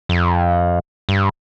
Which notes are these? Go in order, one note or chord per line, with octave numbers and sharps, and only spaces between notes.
F2
G2